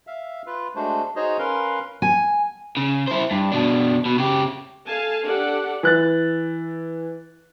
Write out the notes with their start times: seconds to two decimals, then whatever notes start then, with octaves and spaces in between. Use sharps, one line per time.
0.07 E5 F5
0.46 F4 B4
0.76 G#3 A3 D4 F#4 C5
1.16 D#4 F#4 G#4 C5 C#5 D#5
1.39 C#4 A#4 B4 F5 C6
2.02 G#5
2.77 C#3
3.08 E4 C5
3.31 G2
3.52 B2 D4
4.05 B2
4.18 C#3 G4
4.88 A4 F5 G#5 A5
5.24 D4 G4 A4 D5 F#5
5.83 E3 F#6 A6